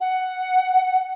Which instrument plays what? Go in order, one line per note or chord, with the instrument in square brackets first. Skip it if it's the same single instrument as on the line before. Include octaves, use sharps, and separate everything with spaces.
[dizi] F#5